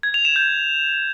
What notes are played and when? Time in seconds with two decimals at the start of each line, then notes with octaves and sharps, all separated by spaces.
0.03 G#6
0.14 F7
0.25 E7
0.36 G6